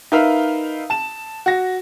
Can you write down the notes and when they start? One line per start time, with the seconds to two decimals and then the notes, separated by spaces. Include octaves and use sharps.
0.12 D#4 A#4 B4 E5 F5
0.90 A5 E7
1.46 F#4 A#6